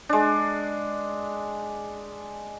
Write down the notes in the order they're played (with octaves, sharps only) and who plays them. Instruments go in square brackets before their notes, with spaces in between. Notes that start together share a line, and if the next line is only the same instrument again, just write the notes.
[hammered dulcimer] G#3 D4